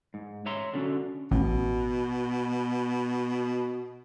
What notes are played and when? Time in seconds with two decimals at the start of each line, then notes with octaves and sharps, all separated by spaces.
0.14 G#2
0.46 C#5 E5 A#5 C6
0.74 D3 C#4 F#4
1.31 A1 B2